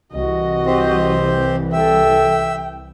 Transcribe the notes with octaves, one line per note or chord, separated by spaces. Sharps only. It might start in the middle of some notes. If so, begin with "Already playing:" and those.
C2 E3 F#4 D#5
C4 G4 C5
A4 E5 G5